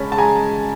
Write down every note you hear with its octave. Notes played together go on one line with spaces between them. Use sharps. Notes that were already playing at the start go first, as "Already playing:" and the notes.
Already playing: C#3 G#3 C#4 A5 B5
A5
G#3 G#5 A#5